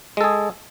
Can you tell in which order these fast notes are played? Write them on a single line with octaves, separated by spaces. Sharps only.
G#3 A4 G#4